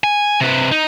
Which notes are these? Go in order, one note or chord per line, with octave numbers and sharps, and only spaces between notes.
G#5
C3 B4
D#4